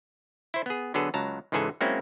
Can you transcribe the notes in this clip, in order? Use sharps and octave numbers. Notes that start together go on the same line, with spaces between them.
E4 C5
B3 G#4
D3 F#3 B3 G#4 A4 B4
C#2 F#3 A5 A#5
C#2 G#2 E3 G#4 A4 G#5
F#3 G#3 A#3 C4 C#4 E4